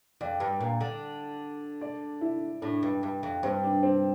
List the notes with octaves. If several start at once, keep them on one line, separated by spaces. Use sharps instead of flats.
F2 D5
G2
A#2
D3
D5
E4
A2 D4
G2
G2
F2
G2 C4
D4
C4